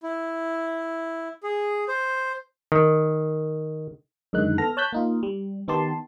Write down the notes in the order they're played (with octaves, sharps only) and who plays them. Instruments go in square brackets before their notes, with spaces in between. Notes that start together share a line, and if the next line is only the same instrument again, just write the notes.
[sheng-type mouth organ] E4
G#4
C5
[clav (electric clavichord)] D#3
[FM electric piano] F#2 D3 D#3 G#3 D#4 F#6
B3 A4 F6 A#6
C#5 A5 F#6 G6 B6
A#3 D#4 F4
G3
D#3 B3 D#4 G4 A5 C6